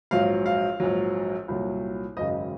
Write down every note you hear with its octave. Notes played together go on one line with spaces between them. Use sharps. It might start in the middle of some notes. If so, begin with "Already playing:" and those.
A#1 G#2 F#3 F5
F5
A#1 G#2 F#3
C2 A#2 F#3
G#1 F#2 C#3 D#5